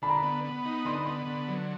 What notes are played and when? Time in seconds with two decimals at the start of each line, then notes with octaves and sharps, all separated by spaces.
0.02 D3 B5
0.10 A#5
0.17 B5
0.23 B3
0.44 B3
0.65 D#4
0.85 D3 C6
0.95 B5
1.05 B3 C6
1.27 D3
1.48 F#3